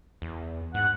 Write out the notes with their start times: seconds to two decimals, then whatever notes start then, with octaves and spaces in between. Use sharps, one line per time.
0.22 E2
0.74 G#2 F#5